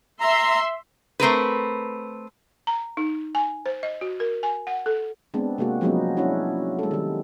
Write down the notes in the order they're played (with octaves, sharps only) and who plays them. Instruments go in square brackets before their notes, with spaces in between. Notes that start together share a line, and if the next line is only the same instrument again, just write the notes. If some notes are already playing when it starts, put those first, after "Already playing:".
[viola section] E5 C6 [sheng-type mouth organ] A#5
[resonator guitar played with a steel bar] A3 C4 A#4 B4
[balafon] A#5
D#4
G#5
C5
D#5
F#4
A#4
G#5
F#5
A4
[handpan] G#3 B3 C4 D4
C3 G#3 A#3 F#4
F3 F#3 G#3 B3 C#4 D#4
C#4 D4 E4 F#4
G#3 A4
D#3 G3